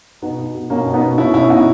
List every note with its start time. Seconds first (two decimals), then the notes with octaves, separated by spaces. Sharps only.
0.22 B2 B3 D#4
0.38 B2
0.55 B2
0.70 B2 A#3 C#4
0.86 B2
0.94 B3 D#4
1.02 B2
1.18 B2 C#4 E4
1.34 B2 C#4 E4
1.50 B2 D#4 F#4